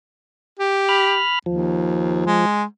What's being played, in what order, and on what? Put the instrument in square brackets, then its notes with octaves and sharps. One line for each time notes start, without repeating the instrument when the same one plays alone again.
[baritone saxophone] G4
[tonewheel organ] B5 F6
[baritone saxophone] D#2 [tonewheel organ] F3
[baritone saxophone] G#3